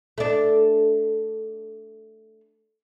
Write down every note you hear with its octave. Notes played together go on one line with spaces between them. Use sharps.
A3 D4